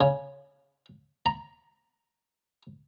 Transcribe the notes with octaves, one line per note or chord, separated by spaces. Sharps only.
C#3
A#5